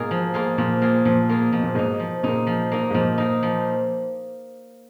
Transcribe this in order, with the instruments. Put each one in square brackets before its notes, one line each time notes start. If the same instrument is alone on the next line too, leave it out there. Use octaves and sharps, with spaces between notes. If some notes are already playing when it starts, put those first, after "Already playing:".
Already playing: [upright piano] G#2 B2 [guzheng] A#3 F4 G#4
[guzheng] F3
A#3 F4 G#4
[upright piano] A#2 [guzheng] F3
[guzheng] A#3 F4 G#4
[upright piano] A#2 [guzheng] F3
[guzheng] A#3 F4 G#4
[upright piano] B2 [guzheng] F3
[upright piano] A#2
[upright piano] G#2 B2 [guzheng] A#3 D#4
[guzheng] F3
[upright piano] A#2 C#3 [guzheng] A#3 D#4
[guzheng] F3
A#3 D#4
[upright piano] G#2
[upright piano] A#2 [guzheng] F3
[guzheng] A#3 D#4
F3